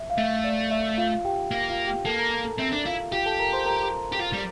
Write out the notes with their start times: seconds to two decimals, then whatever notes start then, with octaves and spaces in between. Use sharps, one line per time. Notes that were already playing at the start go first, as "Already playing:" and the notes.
Already playing: E5
0.10 F5
0.17 A3 E5
0.44 D5
0.71 E5
0.98 F4 F5
1.25 G4 G5
1.51 A#3
1.70 F4 F5
1.87 G4 G5
2.05 A#3 A4 A5
2.19 A#4 A#5
2.32 A#4 A#5
2.45 A4 A5
2.59 C4 E5
2.73 D4
2.86 E4 F4 F5
3.12 F4 G4 F5
3.26 A4 A5
3.39 A#4 A#5
3.53 C5 C6
3.66 A#4 A#5
4.12 G4
4.20 F4
4.33 G3